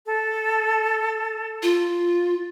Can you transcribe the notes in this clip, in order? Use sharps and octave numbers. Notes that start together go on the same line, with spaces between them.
A4
F4